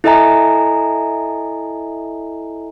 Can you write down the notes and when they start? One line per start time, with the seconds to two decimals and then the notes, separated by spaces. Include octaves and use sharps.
0.04 E4 A4 D#5 E5 G#5 A#5